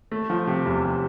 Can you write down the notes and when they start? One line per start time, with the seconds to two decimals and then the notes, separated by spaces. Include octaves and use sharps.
0.12 A3
0.30 F3
0.47 C3
0.66 E2
0.84 C3